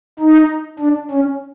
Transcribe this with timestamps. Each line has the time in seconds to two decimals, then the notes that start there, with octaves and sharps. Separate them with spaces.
0.19 D#4
0.79 D4
1.11 C#4